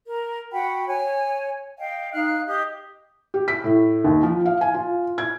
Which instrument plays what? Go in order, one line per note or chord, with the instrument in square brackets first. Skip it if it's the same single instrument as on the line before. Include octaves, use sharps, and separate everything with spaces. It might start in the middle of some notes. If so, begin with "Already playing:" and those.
[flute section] A#4
F#4 F#5 G5 B5
C#5 G#5
D#5 F5 G5
D#4 F5 F6 F#6
G4 D#5 D#6
[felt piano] G4
B6
A2
D#2
F3
F5
G#5
F4
G#6